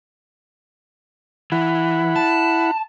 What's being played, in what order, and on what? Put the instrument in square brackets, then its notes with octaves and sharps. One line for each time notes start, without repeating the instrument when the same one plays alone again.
[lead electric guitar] E3 [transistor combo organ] E4 F#5 B5
[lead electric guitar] A5